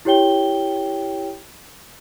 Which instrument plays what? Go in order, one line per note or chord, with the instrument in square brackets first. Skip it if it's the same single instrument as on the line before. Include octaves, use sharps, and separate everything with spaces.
[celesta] E4 G4 C#5 G5 G7